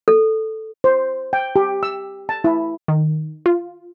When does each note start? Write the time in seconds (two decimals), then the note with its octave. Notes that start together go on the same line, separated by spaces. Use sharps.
0.08 A4
0.84 C5
1.33 G5
1.56 G4
1.83 E6
2.29 A5
2.44 E4
2.88 D#3
3.46 F4